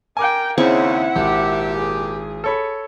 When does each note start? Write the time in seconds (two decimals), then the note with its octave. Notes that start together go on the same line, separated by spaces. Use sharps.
0.17 A#4 G5 G#5 D6
0.58 D#2 C#3 C4 E4 E5 F#5 C#6
1.16 G#1 A#2 G4
1.78 G#4
2.44 A4 C#5 B5